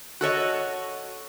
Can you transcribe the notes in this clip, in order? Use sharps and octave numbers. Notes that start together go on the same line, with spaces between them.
F#4 A4 C#5 D#5